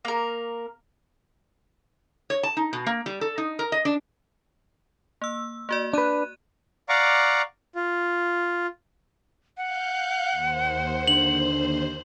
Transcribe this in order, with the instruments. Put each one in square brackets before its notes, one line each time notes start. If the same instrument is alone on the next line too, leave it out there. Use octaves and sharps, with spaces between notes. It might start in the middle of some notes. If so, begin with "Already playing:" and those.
[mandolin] A#3 A#4
[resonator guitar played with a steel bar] C#5
A5
D#4
B2
A#3
G3
A4
D#4
A#4
D#5
D4
[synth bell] A#3 E6
A#3 F#4 D5
[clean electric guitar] D4 B4 [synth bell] F#6 D#7
[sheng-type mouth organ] D5 F5 F#5 A#5 C#6 D6
F4
[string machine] F5 F#6 G6 [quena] F#5
[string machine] D#2 C5
[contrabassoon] D3 [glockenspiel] F#7